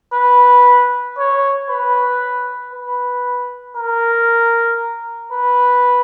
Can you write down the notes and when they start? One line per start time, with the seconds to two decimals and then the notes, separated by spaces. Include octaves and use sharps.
0.14 B4
1.18 C#5
1.70 B4
2.73 B4
3.77 A#4
5.33 B4